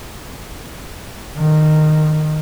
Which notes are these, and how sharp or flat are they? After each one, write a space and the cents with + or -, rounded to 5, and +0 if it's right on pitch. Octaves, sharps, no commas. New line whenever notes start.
D#3 -15